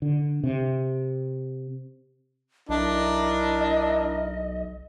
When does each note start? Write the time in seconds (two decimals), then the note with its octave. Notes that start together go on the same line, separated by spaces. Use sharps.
0.02 D3
0.44 C3
2.69 B1 D4 E4 A#4 D#5